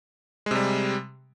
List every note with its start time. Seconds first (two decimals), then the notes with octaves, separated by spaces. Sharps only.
0.46 G#3
0.51 C3
0.55 G3